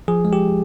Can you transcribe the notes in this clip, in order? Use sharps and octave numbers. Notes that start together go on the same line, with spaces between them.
F3 G#4
G#3
G4